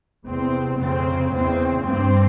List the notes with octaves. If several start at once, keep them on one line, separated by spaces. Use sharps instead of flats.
E2 C3 C4
F2 C#3 C4
E2 C#3 C4
G2 C4